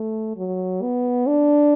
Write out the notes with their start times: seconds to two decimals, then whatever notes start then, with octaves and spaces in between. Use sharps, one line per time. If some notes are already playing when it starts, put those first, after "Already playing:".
Already playing: A3
0.37 F#3
0.82 B3
1.27 D4